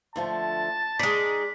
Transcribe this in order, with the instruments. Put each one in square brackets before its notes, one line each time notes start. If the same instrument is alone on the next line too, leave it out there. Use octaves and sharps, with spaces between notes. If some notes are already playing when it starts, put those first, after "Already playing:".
[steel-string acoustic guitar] D3 F3 A3 [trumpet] A5
[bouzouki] G#3 D#4 [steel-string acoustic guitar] D5 [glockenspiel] B6